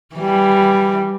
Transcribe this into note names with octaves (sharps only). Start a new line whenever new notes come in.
E3 G3